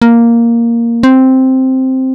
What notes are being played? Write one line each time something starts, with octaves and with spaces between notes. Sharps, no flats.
A#3
C4